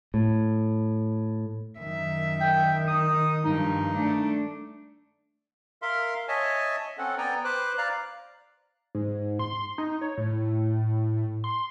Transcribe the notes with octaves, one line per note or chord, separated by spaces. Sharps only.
A2
F#2 D#3 E5
G5
D#4 D#6
G2 F3 D#4
A3 D4
A#4 E5 F5 C6
C#5 D#5 E5 G#5 A5
C4 C#4 A4 F#5
B3 D5 G5 G#5 A#5
B4 C5 D6 F#6
D5 F5 A#5 F#6
G#2
C6
D#4
C#5
A2
C6